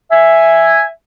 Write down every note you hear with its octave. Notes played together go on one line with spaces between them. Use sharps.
E5 G#5